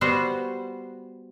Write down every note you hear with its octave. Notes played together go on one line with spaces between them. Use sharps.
G3 B3 F#4 C5